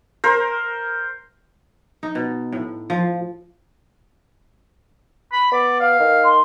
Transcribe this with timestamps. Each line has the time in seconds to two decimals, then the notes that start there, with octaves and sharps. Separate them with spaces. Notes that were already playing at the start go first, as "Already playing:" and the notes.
0.24 A#4 C5
2.03 D#4
2.15 B2
2.52 A2
2.90 F3
5.32 B5
5.52 B3 D5
5.80 F5
6.00 D#3
6.24 C6